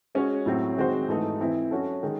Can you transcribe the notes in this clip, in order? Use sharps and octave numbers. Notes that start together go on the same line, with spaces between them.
G#3 C#4 F#4 C#5
A2 F#3 C4
D#3 G#3 C4 F#4 C5
G#2 E3 A3 D#4 A4
E3 C4 E4
F#3 C#4 F#4 A4
D#3 G#3 D#4